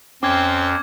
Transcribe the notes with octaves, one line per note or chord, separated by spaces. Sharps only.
F2 C4 C#4 D6 F6 G#6